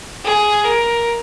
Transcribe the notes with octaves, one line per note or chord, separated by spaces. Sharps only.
G#4
A#4